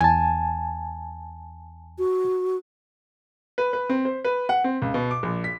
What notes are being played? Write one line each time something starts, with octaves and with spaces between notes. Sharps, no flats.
E2 G#5 A5
F#4
B4
B4
C4
C5
B4
F#5
C4
C#2
B2
D6
A#1
B6